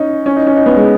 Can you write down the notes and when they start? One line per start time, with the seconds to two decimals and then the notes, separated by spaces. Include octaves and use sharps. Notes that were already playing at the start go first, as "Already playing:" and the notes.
Already playing: C#4 D#4
0.26 C#4
0.36 D#4
0.46 C#4
0.56 D#4
0.66 B3
0.76 G#3